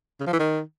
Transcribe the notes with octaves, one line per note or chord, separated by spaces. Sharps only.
C#3
F3
E3
D#3